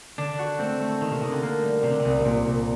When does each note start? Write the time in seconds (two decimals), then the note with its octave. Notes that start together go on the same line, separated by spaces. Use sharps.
0.18 D3 D4
0.39 F#4
0.59 A3 C4
0.80 A3
1.01 D#3 A#3
1.11 C3
1.21 C3 D#4
1.32 D3
1.43 A#3
1.62 G3
1.83 C3 A#3
1.92 D3
1.99 C3
2.05 C2
2.21 C3
2.25 C2 A#2
2.46 C2